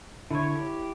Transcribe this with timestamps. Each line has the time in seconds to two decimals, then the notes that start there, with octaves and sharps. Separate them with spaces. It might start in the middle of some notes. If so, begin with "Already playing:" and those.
0.31 D3 E4 C#5
0.55 G4